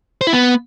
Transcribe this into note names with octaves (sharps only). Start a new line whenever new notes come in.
C5
E4
B3